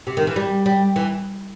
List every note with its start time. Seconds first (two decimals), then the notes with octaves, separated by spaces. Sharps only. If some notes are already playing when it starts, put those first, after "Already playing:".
0.07 C3
0.17 D#3
0.27 E3
0.36 G3
0.66 G3
0.96 E3